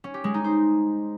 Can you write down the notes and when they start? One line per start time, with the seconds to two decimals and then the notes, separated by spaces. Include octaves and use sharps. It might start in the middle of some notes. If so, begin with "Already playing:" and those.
0.04 C#4
0.14 G4
0.24 G#3
0.34 D#4
0.44 C5